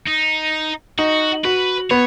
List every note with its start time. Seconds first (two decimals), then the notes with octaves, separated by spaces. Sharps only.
0.07 D#4
0.99 D#4 F#4
1.44 F#4 B4
1.91 B3 C#5